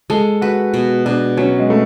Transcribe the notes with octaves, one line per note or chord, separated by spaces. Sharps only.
G#3 A4
F#4 B4
B2
B2 D4
F#3 C#4
G#3
A3